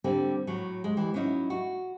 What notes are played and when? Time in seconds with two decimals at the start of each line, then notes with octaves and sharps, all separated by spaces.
0.04 D3 G3 A#3 C4
0.47 A2 F#3
0.84 G#3
0.97 E3 G3
1.14 F#3 C#4 D#4 E4
1.50 F#4